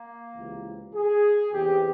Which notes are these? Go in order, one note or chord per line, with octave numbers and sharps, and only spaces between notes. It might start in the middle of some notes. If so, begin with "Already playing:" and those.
Already playing: A#3
C#2 C3 E3
G#4
E2 C3 E3 G4